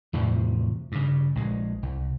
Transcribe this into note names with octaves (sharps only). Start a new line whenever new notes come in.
E2 A2 C3 F3
G2 C#3
A#1 G#3
C2